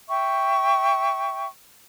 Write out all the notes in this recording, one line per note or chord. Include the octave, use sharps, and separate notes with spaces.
E5 G5 C#6